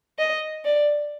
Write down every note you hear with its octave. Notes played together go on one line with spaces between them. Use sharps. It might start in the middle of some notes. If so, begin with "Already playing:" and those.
D#5
D5